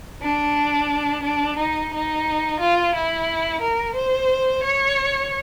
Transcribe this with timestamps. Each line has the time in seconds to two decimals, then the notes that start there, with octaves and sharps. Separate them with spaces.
0.22 D4
1.24 D4
1.57 D#4
1.92 D#4
2.60 F4
2.94 E4
3.61 A#4
3.96 C5
4.63 C#5